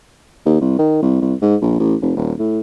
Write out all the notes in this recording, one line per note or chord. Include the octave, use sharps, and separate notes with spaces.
D#2
C2
D#3
C2
C2
G#2
A#1
A1
F1
D#1
A2